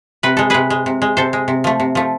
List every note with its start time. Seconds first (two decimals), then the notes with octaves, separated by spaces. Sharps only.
0.23 C3 B4
0.37 G#3 A4
0.50 C3 G#4 B4
0.70 G#3
0.86 C3
1.02 G#3
1.17 C3 A4 C5
1.33 G#3
1.48 C3
1.64 F3 A3
1.80 C3
1.95 F3 A3